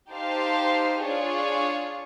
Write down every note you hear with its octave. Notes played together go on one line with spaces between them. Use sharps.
D#4 G4 C5 F5 A5
D4 F4 G#4 C#5